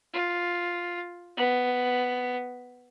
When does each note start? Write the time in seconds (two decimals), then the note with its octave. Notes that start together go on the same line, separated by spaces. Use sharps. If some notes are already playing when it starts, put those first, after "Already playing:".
0.14 F4
1.37 B3